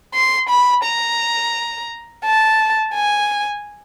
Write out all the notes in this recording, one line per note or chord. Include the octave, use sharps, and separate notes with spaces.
C6
B5
A#5
A5
G#5